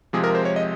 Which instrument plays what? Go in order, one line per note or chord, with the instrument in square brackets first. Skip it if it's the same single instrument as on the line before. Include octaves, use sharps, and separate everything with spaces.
[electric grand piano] C3 F3 G#3 G#4
A#4
C5
C#5
D#5